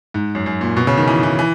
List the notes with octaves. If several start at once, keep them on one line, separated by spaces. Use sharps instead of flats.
G#2
F#2
F#2
A#2
B2
C#3
D#3
E3
E3
E3